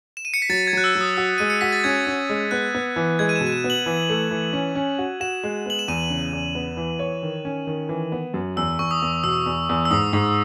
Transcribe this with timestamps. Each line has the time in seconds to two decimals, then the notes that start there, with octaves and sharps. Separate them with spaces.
0.17 E7
0.25 D#7
0.34 C#7
0.42 B6
0.49 F#3 A6
0.67 G#6
0.73 F#3 F#6
0.84 E6
0.95 F#3
1.01 D#6
1.17 F#4 E6
1.38 G#3 D#7
1.50 C#7
1.61 F#4 B6
1.73 A6
1.84 C#4 G#6
2.07 C#4
2.29 G#3
2.51 B3 F#6
2.75 B3
2.96 E3
3.19 G#3 G#6
3.29 D#7
3.36 E7
3.41 B2
3.47 D#7
3.52 E7
3.64 B3
3.70 F#7
3.86 E3
4.09 A3
4.31 E3
4.53 C#4
4.75 C#4
4.99 F#4
5.21 F#4 E7
5.43 G#3
5.66 B3 F#7
5.79 E7
5.88 E2 D#7
6.10 C#3
6.33 E2
6.55 B3
6.77 E3
6.99 C#5
7.23 D#3
7.45 C#4
7.67 D#3
7.89 E3
8.12 B3
8.34 F#2
8.57 E2 E6
8.79 E2 C#6
8.91 D#6
9.02 E2
9.24 B2 E6
9.46 E2
9.69 E2
9.85 E6
9.91 G#2 D#6
10.13 G#2